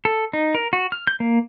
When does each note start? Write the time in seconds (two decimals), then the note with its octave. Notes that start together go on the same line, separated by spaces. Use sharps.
0.05 A4
0.33 D#4
0.55 A#4
0.73 F#4
0.92 F6
1.07 G6
1.20 A#3